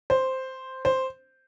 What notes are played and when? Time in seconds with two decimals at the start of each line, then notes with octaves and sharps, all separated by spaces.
0.10 C5
0.85 C5